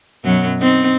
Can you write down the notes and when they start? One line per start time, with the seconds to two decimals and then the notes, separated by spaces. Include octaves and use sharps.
0.24 F#2 B2 F#3
0.59 C4 D#4